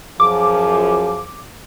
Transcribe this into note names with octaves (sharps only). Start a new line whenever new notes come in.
F#2 F3 G#4 D6